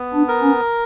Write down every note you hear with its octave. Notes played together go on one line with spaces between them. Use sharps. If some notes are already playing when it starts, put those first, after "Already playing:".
Already playing: B3
D4
A#4
C#4